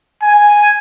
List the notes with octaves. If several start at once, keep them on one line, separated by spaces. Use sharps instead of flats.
G#5